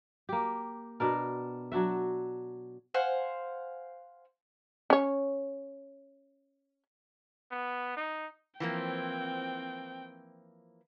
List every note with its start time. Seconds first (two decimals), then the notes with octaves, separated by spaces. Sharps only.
0.29 A#3 G4
1.00 B2 D4 A#4
1.72 F#3 D4 F#4 E5
2.94 C5 F5 F#5 G#5
4.90 C#4 C#5
7.51 B3
7.97 D#4
8.60 E3 F3 A#3 C4 G5